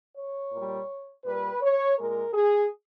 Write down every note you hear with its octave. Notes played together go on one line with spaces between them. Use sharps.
C#5
A#2 G3
A#2 G3 B4
C#5
A#2 G#3 A#4
G#4